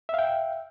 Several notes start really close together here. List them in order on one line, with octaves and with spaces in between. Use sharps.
E5 F5 G5